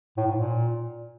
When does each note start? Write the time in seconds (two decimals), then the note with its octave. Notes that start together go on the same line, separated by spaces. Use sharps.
0.17 A2
0.27 G#2
0.38 A#2